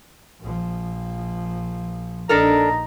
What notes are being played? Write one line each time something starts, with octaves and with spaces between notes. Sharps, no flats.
A#1 F3
A#1 D4 D#4 A4 A#4 A#5